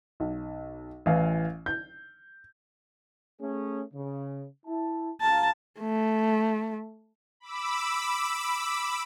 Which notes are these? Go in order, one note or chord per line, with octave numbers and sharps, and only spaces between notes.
B1
A1 E3 F5
G6
A3 C#4 G#4
C#3
E4 A5
C#2 F5 A5 A#5
A3
B5 D6 E6